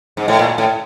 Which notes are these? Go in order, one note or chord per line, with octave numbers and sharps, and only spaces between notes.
G#2
A2
A#2
A2